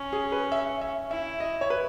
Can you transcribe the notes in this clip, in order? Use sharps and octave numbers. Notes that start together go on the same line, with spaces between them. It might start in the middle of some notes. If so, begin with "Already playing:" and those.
Already playing: C#4
G#4
B4
E5
E5
E4 E5
D#5
C#5
B4